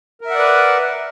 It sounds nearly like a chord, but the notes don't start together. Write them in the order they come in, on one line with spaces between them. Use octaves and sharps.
A#4 E5 F#5 D5 B4